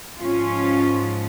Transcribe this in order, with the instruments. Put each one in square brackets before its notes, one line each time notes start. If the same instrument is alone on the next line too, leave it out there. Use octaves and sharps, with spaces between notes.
[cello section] G#2 F3 C#4 F4